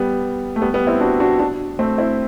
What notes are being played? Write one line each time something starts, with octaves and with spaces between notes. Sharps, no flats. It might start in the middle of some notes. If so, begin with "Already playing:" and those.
Already playing: G3 B3
A3
G3 B3
G3 B3
C4 E4
D4 F#4
D4 F#4
D4 F#4
A3 C4
C4 E4